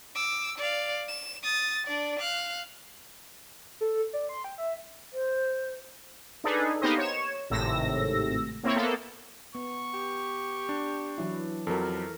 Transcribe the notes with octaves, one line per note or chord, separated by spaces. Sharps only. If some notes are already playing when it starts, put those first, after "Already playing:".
D6 E6
D5 F5
E7
D#6 A6
D4 D5
F5 F#6
A4
D5
C6
G5
E5
C5
D4 D#4 G#4 A4 B4
A#3 B3 D#4 G4 C5 D#5
C#5 E7
G#1 A2 C3 E6 A#6
A#3 C4 E4 C#5
A#3 B3 A4
B3 C#6
G4
D4
E3 F#3 E4
F2 F#3 A4 A#4